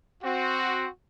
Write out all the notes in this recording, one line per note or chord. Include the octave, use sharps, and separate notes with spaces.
C4 F#4